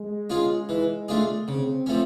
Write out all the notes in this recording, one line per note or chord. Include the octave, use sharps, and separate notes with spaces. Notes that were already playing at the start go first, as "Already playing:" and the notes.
Already playing: G#3
C#4 F4 G#4
E3
A3 D4 F4 G#4
C#3 C4
F3 A3 C#4